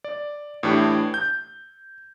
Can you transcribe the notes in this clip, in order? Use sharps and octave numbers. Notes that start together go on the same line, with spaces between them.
D5
A2 E3 D4 G4
G6